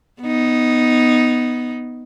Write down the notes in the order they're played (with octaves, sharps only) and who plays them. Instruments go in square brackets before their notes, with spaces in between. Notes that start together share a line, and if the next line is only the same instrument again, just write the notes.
[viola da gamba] B3 D#4